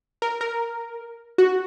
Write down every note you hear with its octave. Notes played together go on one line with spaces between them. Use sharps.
A#4
A#4
F#4